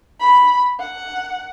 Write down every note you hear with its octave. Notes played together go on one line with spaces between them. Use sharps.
B5
F#5